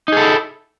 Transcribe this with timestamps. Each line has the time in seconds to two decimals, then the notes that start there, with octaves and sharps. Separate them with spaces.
0.08 D#4
0.12 G#4
0.17 A4
0.21 E4